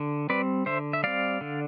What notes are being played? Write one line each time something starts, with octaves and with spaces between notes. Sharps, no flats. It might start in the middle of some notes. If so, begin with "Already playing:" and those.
Already playing: D3
G3 C4 B4 D5
D3 C5 E5
E5
G3 C4 D5 F5
D3